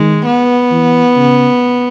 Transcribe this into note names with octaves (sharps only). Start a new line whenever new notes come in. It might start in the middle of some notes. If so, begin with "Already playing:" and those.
Already playing: D#3 G#3
B3
E3
C#3